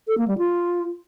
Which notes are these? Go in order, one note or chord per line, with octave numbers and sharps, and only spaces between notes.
A4
A#3
G3
F4